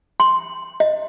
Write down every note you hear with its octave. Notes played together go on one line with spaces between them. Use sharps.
C6
D#5